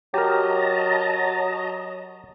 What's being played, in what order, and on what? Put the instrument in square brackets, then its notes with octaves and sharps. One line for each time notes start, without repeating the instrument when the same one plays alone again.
[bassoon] F#3 [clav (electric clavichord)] G4 A#4 [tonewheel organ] D#5 A5 A#5